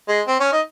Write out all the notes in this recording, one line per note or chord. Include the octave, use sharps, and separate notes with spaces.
G#3
C4
C#4
D#4